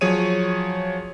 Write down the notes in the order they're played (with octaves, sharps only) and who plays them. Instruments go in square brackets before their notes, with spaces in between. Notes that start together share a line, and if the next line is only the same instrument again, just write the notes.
[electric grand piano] F3 F#3 G#4 C#5 D#7